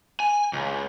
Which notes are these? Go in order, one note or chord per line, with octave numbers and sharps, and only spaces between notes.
G#5
C#2